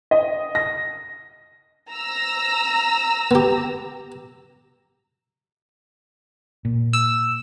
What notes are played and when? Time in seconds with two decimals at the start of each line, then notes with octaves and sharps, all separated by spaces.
0.11 D#5
0.55 A#6
1.92 A#5 E6
3.31 B3 G4
6.65 A#2
6.93 E6